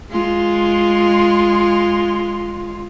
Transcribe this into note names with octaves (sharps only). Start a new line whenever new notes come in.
G#3 F4